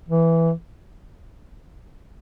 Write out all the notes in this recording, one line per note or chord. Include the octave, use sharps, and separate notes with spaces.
E3